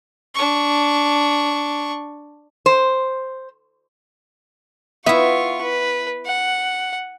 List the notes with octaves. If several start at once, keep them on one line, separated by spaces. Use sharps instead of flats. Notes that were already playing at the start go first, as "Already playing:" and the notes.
D4 C#6
C5
B3 E4 F4 E5 C#6
B4
F#5